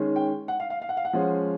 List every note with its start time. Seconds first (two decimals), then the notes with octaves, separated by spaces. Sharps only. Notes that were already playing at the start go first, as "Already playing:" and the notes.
Already playing: D#3 G#3 C#4
0.16 G5
0.48 F#5
0.60 F5
0.70 F5
0.82 F5
0.89 F#5
0.97 F5
1.05 F#5
1.13 F3 G#3 C#4